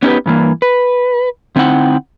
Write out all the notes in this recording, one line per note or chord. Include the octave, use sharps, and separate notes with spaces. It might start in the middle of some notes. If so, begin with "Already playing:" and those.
B3 C#4 D#4 E4 G4 B4
G2 E3 A#3
B4
D3 C4 D#4 E4 F#5 G5